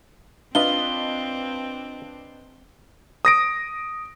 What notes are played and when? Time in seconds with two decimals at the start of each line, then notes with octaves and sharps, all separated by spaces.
0.55 C4 D4 F4 B4 D#5 F5 G7
3.25 D#6 A#6 D7